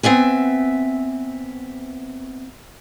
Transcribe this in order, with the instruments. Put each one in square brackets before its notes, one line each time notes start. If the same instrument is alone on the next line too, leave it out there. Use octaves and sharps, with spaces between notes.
[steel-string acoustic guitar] B3 C4 E5 G#5